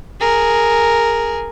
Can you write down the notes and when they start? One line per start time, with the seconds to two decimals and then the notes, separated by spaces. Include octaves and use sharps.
0.20 G#4 A#4